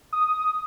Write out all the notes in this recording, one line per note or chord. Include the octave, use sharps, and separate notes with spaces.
D#6